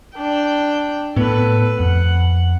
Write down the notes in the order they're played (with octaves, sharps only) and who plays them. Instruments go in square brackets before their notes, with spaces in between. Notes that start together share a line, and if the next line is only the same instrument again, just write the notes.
[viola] D4 G5
[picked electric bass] A2 B3 [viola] A4 B4
[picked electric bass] F2 [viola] F#5